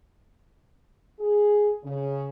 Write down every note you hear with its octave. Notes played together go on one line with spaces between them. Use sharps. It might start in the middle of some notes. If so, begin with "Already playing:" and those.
G#4
C#3